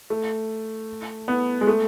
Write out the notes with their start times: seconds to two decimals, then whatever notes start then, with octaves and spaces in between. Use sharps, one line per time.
0.10 A3
1.28 B3
1.61 G#3
1.67 A3